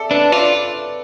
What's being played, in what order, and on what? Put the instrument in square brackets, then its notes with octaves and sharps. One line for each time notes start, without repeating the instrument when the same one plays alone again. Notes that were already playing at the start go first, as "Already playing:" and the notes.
Already playing: [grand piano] A4 D5 E5
[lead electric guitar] D4 [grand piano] B4
[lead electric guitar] F4 [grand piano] D5